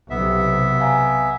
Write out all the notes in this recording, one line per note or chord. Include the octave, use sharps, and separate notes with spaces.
B1 C3 B3 E5
F5 G#5 A#5